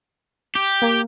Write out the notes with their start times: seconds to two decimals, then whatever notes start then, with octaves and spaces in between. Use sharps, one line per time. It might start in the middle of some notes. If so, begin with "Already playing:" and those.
0.55 G4
0.82 A#3